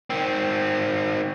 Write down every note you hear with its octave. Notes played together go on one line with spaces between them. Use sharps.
D#3 C4